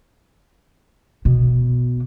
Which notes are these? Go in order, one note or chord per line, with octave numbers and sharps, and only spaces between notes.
B2